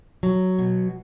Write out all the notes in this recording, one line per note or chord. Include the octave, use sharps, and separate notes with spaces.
F#3
B2